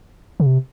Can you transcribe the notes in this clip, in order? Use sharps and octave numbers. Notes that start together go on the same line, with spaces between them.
C#3
C3